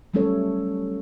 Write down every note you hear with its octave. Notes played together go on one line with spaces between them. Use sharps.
F#3 G3 A3 C#4 A4 C#5